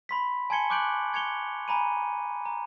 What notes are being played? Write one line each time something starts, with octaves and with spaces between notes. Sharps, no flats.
B5 C6 B6
G#5 A5 C6 G#6 C#7 G7
C#6 D6 F#6 G6 D7 F#7
C#6 G#6 C#7 F7 G7
G#5 A#5 B5 D#7
A#5